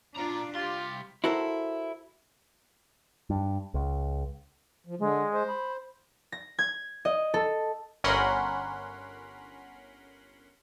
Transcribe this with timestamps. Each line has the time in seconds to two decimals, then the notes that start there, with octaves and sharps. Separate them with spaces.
0.16 A#2 D4 F4 D5 A#5
0.55 C2 F4 G4 C6
1.24 E4 F#4 A4 A#4 C5
3.30 G2
3.74 C#2
4.87 F3
4.99 D3 G#3
5.34 C5
5.47 B5
6.32 A#6
6.59 G#6
7.05 D#5
7.34 A4
8.04 G1 C#4 A#4 F#5 B5 C6